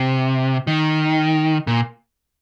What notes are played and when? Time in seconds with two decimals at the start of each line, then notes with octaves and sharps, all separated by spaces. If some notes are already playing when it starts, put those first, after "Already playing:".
Already playing: C3
0.67 D#3
1.67 A#2